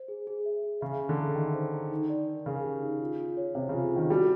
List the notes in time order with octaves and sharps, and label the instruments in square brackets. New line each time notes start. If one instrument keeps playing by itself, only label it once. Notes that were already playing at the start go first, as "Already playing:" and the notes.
Already playing: [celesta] C5
G#4
G#4
E5
G#4
[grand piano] C#3 [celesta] E5
[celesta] E5
[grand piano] D3
[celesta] A#5
[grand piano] D#3 [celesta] E5
[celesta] C5
A#5
D#4
D5
A#4
[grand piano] C#3 [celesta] A#4
[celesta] G4
D#4
F4
F4
C#5
[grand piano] C3 [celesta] C#5
[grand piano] C#3 [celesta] F4
[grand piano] D#3 [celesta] F4
[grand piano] G3 [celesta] F#4